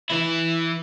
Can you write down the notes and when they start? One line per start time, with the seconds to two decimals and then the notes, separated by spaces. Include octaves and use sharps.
0.10 E3 E4